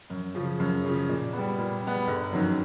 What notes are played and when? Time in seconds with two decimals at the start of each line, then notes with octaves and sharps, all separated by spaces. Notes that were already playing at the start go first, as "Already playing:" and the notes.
0.10 F#2
0.35 C#3 F3
0.59 F#2
0.84 C#3 F3
1.09 A#2
1.33 B3
1.38 G3
1.58 A#2
1.83 G3 B3
2.07 G1
2.32 F#2 D#3 F#3